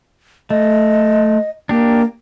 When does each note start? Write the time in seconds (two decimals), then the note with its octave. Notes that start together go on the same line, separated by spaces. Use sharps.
0.50 A3 D#5
1.69 A#3 D4 G4